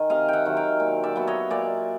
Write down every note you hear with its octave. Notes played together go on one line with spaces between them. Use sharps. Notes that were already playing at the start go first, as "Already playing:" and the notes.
Already playing: D#3 G#5
C3 D#5 F5
E5 F#5 G5
D#3 F#3
F5 G5
A#2
D5 E5
F#3 B3
C#5 D#5
A#2 D5 E5